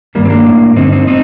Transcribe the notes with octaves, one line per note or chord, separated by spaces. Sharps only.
G2 D#3 G3 A#3
C4
A#3 D4
A2
G2 D3 C4 D#4
C4 D#4
C4 D#4